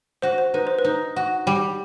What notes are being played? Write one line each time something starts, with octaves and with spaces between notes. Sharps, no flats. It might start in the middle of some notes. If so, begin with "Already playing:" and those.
F#4 C5
C5
D#4 B4
C5
B4
D#4
F#4
G3